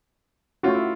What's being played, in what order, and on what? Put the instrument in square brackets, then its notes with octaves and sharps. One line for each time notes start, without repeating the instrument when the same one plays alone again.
[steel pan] A3 C#4 F#4 [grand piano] F4
[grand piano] E4